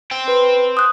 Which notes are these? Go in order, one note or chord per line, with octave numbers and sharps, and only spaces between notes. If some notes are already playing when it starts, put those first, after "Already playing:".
C5 G5
B4
D#6 F#6